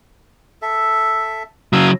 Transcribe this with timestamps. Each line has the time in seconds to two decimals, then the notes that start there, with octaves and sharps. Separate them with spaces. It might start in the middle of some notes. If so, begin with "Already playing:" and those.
0.62 A4 E5
1.73 C#3 F#3 F5 D#6 E6